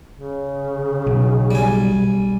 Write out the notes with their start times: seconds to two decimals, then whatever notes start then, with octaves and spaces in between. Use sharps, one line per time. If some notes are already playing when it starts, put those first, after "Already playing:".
0.17 C#3
1.07 B1
1.51 G3 G#5